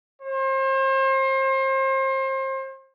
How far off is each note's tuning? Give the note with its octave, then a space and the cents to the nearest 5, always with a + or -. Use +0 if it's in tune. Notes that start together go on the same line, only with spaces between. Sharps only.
C5 +35